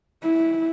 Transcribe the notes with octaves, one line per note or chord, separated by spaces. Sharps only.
E4